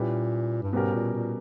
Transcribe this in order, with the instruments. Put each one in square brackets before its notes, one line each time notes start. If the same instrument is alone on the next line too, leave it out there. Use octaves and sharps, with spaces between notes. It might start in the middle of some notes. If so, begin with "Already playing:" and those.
Already playing: [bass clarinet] A#2 [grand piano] G3 C#4 E4 G4 B4
[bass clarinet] G2
[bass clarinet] G#2 [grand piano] B2 G3 C#4 G4 A#4
[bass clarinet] A#2
A#2